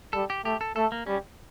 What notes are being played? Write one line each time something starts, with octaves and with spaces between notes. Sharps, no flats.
G3 A4
G4
A3 G4
A4
A3 A4
A#3
G3 C#4